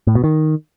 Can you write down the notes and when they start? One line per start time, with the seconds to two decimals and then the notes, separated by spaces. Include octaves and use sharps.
0.07 A2
0.15 B2
0.24 D#3